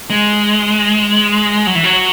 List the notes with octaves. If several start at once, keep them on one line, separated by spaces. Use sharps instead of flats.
G#3
F#3
E3
F#3